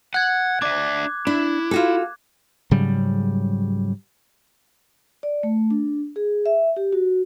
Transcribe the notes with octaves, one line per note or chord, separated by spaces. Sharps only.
F#5 F#6 G#6
D4 D5 E5 D6
D4 E4
F4 F#4 A4
G#2 C#3 F#3 G3
D5
A3
D4
G#4
E5
G4
F#4